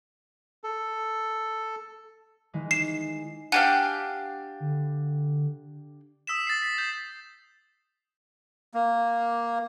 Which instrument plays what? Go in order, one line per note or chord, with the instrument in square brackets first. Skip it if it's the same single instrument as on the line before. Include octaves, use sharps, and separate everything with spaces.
[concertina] A4
[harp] D#3 E3 G#3
[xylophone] C7 E7
[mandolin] D4 G4 F5 [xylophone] F#5 G#5
[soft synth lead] D3
[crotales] D#6 E6 B6 E7
A6 C7
B6
G6 F7
[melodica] A#3